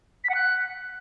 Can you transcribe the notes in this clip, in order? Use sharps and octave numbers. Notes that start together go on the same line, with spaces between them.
B6
F#5
F#6